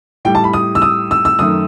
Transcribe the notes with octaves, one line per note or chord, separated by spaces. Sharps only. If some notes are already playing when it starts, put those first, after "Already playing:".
A2 G3 G5
A5
B5
D#6
E6
D#6
E6
E6
F#2 D#3 A3 D#6